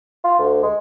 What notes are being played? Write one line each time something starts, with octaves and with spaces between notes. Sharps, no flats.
F4
D2
G#3